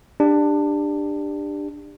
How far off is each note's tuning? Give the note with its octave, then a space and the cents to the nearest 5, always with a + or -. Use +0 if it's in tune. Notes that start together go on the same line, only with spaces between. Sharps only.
D4 +15 G4 +25